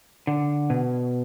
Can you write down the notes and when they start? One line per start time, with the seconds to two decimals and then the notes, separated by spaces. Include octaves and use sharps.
0.27 D3
0.70 B2